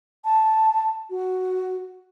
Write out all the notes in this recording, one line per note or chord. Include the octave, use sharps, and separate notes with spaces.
A5
F#4